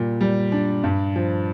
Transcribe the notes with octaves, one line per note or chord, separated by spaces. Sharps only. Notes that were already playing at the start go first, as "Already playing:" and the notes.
Already playing: A#2 G3
G3
D4
G2
F3